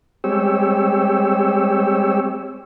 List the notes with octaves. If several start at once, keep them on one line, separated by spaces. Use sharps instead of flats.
G3 G#3 C4 G4 C#5 E6